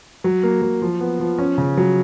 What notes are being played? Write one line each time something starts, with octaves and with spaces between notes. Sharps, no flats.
F#3
A#3
F#3
F3
B3
F3
C#4
C#3
F#3